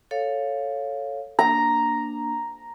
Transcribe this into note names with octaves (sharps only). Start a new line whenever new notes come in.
A4 C#5 F5
A#3 D4 A#5